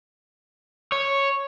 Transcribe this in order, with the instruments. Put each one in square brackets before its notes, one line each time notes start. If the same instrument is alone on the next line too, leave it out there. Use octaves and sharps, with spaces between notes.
[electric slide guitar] C#5